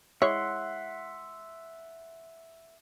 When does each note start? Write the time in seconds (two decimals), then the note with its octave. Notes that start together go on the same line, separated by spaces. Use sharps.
0.22 G#3 E4 C#5 E5 F#5 C6